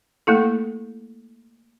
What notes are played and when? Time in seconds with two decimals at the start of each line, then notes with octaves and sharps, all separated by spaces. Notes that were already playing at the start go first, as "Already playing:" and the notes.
0.27 A3 A#3 E4 A4